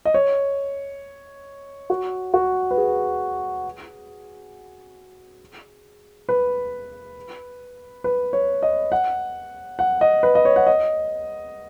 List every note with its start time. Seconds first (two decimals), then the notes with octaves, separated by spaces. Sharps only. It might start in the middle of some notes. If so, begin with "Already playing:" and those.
0.05 D#5
0.14 C#5
1.90 F#4
2.34 F#4
2.71 B4
2.78 G#4
6.29 B4
8.04 B4
8.33 C#5
8.63 D#5
8.92 F#5
9.79 F#5
10.01 D#5
10.23 B4
10.35 D#5
10.45 C#5
10.56 F#5
10.67 D#5